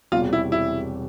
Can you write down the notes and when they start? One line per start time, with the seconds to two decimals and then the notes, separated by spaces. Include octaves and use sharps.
0.12 E1 E2 C3 G3 F4
0.33 E4
0.52 E4